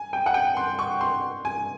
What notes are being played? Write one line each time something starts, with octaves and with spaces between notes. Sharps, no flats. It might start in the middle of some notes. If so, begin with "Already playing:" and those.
Already playing: G#5
G5
F#5
G5
C6
C#6
C6
G#5